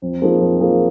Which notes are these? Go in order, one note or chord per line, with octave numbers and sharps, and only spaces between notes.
F2
F3 A#3 D#4 G#4
F2
F3 A#3 D#4 G#4